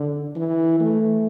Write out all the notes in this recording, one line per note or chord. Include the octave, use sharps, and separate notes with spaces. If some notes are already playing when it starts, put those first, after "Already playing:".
Already playing: D3
E3
A3